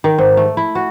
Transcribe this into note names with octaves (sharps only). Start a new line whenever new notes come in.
D#3
G#2
A3
E4
F#4